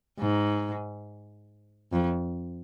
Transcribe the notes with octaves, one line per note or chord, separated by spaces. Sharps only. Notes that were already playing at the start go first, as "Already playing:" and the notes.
G#2
F2